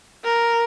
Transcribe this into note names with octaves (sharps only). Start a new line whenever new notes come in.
A#4